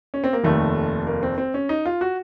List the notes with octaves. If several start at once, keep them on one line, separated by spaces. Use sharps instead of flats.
C#4
C4
A#3
F1 D#2 D#3 A3
A#3
C4
C4
C#4
D#4
F4
F#4